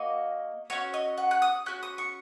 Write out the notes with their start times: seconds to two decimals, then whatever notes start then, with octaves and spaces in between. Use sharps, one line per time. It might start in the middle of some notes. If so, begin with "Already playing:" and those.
Already playing: A#3 F#4 D#5
0.70 C#4 F#4 C#5
0.94 D#5
1.18 F#5
1.31 F#6
1.42 D#6
1.66 C#4 F#4 F#6
1.83 D#6
1.98 C#6